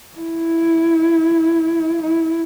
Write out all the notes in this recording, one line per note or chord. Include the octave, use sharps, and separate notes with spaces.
E4
E4